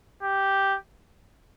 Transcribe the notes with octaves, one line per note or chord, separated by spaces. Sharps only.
G4